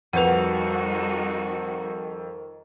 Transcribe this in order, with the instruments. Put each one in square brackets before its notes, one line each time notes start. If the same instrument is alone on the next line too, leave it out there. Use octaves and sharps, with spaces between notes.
[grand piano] F2 F7 [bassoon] D#3 [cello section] G3 D#4 F#4 [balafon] B4 F#5